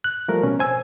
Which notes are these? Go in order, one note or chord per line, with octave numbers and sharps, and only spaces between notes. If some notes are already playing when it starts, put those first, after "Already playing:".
F#6
F3 G3 A3 A#4
B2 C#4
C5 G#5 E6